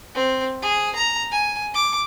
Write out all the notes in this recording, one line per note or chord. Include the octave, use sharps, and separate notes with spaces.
C4
G#4
A#5
G#5
D6